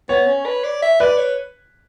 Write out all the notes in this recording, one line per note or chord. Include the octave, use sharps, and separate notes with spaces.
B3 C#5
C#4
B4
D5
E5
B4 D5
C#5